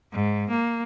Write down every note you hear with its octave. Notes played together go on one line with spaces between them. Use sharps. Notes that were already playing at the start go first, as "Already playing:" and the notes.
G#2
A#3